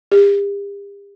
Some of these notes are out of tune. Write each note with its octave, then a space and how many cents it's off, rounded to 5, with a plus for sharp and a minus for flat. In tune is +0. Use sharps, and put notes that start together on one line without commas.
G4 +40